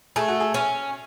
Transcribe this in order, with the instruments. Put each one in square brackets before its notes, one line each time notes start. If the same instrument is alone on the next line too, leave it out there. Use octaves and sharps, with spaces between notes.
[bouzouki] A3 [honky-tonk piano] G#4
[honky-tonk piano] F#4
G#4
[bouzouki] C#4